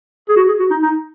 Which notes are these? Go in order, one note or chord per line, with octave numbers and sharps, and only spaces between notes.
G#4
F#4
G#4
F#4
D#4
D#4